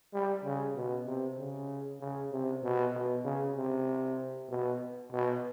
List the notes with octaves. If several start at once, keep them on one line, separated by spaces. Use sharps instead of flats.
G3
C#3
B2
C3
C#3
C#3
C3
B2
B2
C#3
C3
B2
B2